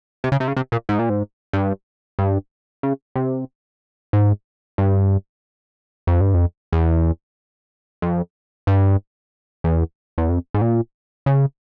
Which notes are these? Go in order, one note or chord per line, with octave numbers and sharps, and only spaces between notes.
C3
C#3
C3
C#3
C3
A#2
G#2
A#2
G#2
G2
G2
C#3
C3
G#2
G2
F2
G2
F2
E2
F2
G2
E2
E2
F2
G#2
A#2
C#3